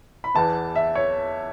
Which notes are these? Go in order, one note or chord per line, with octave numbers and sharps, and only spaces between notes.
B5
E2 E3 B3 A5
E5
C#5